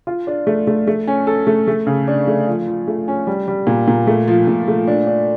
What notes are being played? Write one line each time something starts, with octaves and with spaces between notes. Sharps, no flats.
F4
D4
A3
A3
A3
C#4
A4
A3
A3
C#3
D4
A3
F3
F3
A3
C#4
G3
G3
A#2
A#2
A3
F3
A#2
A3
D4
D4